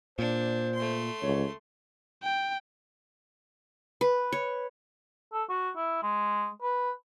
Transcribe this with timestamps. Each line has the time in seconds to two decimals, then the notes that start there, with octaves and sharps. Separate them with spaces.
0.19 A#2 D4 C5
0.75 A3 C6
1.22 C#2 C#5
2.23 G5
4.01 B4
4.32 C#5
5.33 A4
5.49 F#4
5.76 E4
6.03 G#3
6.62 B4